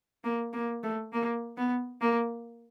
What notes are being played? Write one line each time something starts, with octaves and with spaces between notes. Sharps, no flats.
A#3
A#3
A3
A#3
B3
A#3